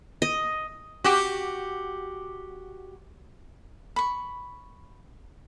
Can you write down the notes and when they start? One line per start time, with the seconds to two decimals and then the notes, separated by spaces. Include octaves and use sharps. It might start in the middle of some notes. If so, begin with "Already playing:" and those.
0.22 D#5
1.04 F#4 G4
3.96 B5 C#6